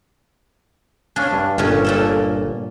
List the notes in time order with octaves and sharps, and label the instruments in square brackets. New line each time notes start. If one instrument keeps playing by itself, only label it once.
[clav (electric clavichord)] C#4 F5 G#5 [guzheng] D4
[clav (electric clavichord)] G2
[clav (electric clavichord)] G1 [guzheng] A#2 C#4
[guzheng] A#2 A#3 A4